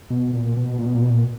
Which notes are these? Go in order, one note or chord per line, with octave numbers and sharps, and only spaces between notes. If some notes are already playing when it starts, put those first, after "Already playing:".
B2
A#2
B2
A#2
B2
A#2
B2
A#2